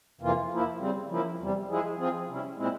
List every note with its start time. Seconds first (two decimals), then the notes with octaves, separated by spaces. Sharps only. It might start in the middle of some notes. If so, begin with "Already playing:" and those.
0.21 F2 C3 E3 A#3 F4
0.51 F3 A#3 E4
0.79 C#3 G3 C4
1.09 C#3 F3 A#3 E4
1.39 E2 C3 G3
1.68 F3 G#3 E4 G#4
1.98 F3 C4 F4 G#4
2.27 C3 G3 C#4 E4
2.57 A#2 G#3 C4 E4